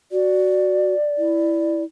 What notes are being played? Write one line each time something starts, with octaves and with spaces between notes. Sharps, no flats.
F#4 D5
E4